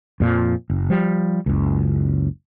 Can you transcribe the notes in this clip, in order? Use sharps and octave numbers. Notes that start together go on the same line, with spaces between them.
F2 A#2 F3
F#1
F3 G3
F#1 C#2